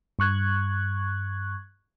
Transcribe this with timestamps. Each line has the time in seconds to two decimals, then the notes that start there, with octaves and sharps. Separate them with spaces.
0.19 G2 C#6 F#6 G#6